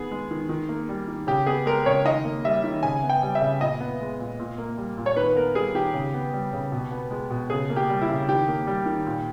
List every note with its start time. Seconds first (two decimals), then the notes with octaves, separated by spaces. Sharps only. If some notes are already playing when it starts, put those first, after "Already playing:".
Already playing: D#3 B3 G#4
0.11 G#3
0.31 D#3
0.49 D#3
0.69 A#3
0.89 G3
1.08 D#3
1.27 C#3 G4
1.46 B3 G#4
1.66 G#3 A#4
1.86 C#3 C#5
2.05 D#3 D#5
2.25 A#3
2.44 G3 E5
2.64 D#3
2.83 C#3 G#5
3.03 B3
3.09 G5
3.22 G3
3.35 E5
3.41 C#3
3.60 A#2 D#5
3.80 B3
4.01 G#3
4.20 A#2
4.40 A#2
4.58 A#3
4.78 G3
4.98 A#2
5.06 C#5
5.16 D#3 B4
5.36 B3 A#4
5.55 G3 G#4
5.75 D#3 G4
5.94 C#3
6.14 B3
6.33 G3
6.53 C#3
6.72 B2
6.91 B3
7.11 G#3
7.30 B2
7.50 C#3 G#4
7.70 A#3
7.76 G4
7.90 G3
8.02 E4
8.09 C#3
8.28 D#3 G4
8.48 A#3
8.67 G3
8.86 D#3
9.06 A#2